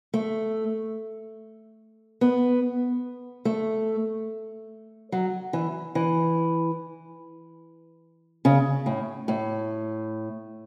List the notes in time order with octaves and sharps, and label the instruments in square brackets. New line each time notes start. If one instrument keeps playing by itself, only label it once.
[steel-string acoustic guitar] A3
B3
A3
F#3
E3
E3
C#3
A2
A2